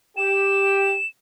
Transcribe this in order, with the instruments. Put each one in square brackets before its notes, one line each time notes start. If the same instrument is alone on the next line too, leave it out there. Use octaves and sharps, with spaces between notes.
[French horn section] G4 [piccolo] E7